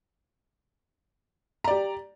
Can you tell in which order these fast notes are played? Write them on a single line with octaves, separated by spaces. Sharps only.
A#5 D5 G4